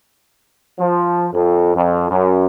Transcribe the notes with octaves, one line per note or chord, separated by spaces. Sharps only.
F3
F2
F2
F#2